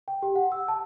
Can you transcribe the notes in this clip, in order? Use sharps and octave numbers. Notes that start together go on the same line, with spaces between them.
G5
G4
F#5
E6
A5